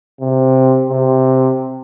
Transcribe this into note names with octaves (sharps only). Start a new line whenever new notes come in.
C3
C3